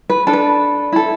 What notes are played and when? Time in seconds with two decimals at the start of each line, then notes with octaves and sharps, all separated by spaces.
0.10 B4
0.27 D4 A4
0.33 B4
0.93 E4 A4